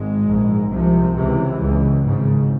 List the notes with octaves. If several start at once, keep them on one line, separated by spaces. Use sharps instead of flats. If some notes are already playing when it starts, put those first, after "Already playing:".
Already playing: G#1 G#3
A#1 G#2
C2 C3 F3
C#2 C3 E3
C#2 C#3
G#1 G#2 C#3